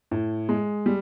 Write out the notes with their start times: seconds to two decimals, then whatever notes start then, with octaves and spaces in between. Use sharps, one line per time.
0.11 A2
0.49 G#3
0.86 G3